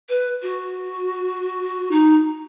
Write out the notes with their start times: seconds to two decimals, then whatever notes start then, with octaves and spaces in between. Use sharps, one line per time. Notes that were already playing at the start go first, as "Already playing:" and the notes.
0.09 B4
0.42 F#4
1.91 D#4